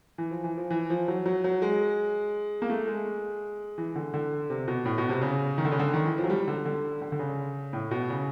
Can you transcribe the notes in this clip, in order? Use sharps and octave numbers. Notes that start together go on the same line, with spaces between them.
E3
F3
E3
F3
E3
F3
F#3
F#3
F#3
G#3
A#3
A3
G#3
E3
D3
D3
C3
B2
A2
B2
C3
C#3
D#3
D3
C#3
D3
D#3
E3
F3
F#3
G3
D3
D3
D3
D3
C#3
A2
B2
C#3